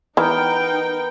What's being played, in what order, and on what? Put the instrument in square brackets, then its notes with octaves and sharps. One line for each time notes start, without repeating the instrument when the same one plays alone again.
[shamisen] E3 [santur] B3 A#4 [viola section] D#4 G5